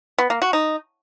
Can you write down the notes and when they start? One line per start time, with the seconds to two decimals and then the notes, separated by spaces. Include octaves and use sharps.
0.18 B3
0.30 A#3
0.42 F#4
0.53 D#4